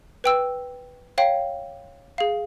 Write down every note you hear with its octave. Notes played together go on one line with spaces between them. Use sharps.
B4 G5 E6
C#5 F5 G5
G#4 F5